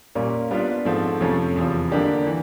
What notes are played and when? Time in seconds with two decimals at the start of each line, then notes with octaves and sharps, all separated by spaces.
0.15 A#2 G3 A#3 C#4
0.51 G3 B3 D4 F4
0.85 G#2 F3 A3 C4
1.20 F2 C3 F3 A3 C#4
1.56 E2 C3 F3
1.92 D3 G3 A#3 D4 G4
2.27 E3